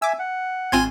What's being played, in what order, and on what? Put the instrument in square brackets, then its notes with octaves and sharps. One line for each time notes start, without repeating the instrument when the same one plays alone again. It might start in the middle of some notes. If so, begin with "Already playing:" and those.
[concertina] E5 G#5 [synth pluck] D6 E6
[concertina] F#5
[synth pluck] G#1 C4 F4 [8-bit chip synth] G#5 C6 G#6